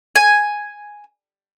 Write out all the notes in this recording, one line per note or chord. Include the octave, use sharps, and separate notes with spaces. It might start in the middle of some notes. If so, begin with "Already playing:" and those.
G#5